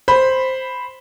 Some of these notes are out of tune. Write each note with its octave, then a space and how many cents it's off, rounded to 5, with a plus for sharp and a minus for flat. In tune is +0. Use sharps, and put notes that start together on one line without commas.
C5 +0 B5 +0